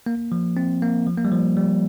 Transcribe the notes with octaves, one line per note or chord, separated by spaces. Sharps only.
A#3
F3
C4
A#3
F3
A#3
G3
F3
G3